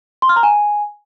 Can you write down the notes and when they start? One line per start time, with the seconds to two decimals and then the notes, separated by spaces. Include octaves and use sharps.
0.22 C6
0.29 F6
0.36 A#5
0.43 G#5